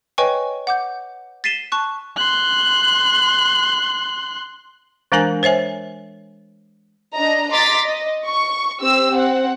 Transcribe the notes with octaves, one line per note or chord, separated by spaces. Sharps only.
B4 C#5 D#5 G5 G#5 C#6
F#5 D6 G6
A6 B6 C7 D#7 E7 G7
A5 C#6 F#6
C6 F#6
E3 G#3 D4 A#4 G#5
C5 C#5 E5 G#5
D4 D#5 A#5
D#5 A#5 C6 D6 A6 B6
D#5
C#6
C4 G4 E6
C4 F#5